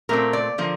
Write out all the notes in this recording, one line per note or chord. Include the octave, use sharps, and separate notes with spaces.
A#2 A3 C4 A#4
D5
D3 F3 A#3